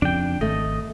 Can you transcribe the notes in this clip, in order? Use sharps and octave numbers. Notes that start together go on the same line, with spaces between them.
F2 C#3 D4 G5
G#1 A3 D#5